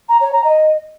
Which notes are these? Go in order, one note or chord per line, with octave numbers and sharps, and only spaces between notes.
A#5
C#5
A#5
D#5